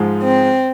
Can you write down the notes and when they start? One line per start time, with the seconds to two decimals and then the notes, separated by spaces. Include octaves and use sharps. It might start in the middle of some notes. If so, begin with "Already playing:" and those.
Already playing: G#2 F3 G#3
0.23 C4